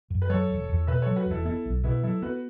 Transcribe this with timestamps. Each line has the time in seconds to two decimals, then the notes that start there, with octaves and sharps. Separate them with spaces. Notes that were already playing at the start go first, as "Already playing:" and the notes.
0.10 F#2
0.22 B4
0.30 F#3 A4 C#5
0.49 E1
0.69 E2
0.87 B2 B4 E5
1.02 F#3 A4 C#5
1.16 F#4 B4
1.26 E1
1.31 E4 A4
1.45 B3 E4 A4
1.65 B1
1.83 B2 B3 E4
2.03 F#3 E4 A4
2.22 B3 F#4 B4